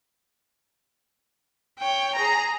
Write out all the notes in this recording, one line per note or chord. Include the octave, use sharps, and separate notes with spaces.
C#5 G5
G#4 A#5